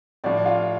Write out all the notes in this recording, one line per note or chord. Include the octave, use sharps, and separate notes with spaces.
A2 F3 D4 D5
F4 F5